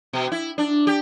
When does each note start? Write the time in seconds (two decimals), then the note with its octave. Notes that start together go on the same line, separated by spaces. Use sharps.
0.13 B2
0.32 E4
0.58 D4
0.87 G4